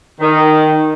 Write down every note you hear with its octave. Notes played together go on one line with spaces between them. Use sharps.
D#3